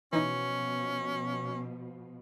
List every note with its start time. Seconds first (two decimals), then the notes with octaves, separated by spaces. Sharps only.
0.13 B2 E3 F3 C#4 D#4